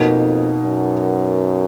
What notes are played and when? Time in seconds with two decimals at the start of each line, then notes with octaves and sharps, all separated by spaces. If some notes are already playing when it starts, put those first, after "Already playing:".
Already playing: F2 B2 A#3 D#4
0.62 F#2